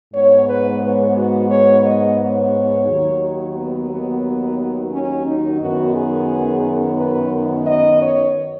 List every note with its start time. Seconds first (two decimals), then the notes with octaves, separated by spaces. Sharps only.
0.14 G#2 G#3 B3 C#5
0.48 B4
0.82 C#5
1.17 F#4
1.50 C#5
1.85 D#5
2.19 C#5
2.87 D#2 D#3 F#3
3.56 B3
3.89 B3
4.92 C#4
5.26 D#4
5.60 F#2 D#3 B3 F#4
5.95 G#4
6.97 B4
7.65 D#5
8.00 C#5